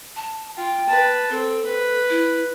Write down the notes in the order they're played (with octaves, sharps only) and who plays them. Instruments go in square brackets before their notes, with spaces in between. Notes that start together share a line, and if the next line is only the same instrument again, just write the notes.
[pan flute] A5
[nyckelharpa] F4 [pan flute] G5
[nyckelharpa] B4 A5
[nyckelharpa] C4 [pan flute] A4
[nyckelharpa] B4
[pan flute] E4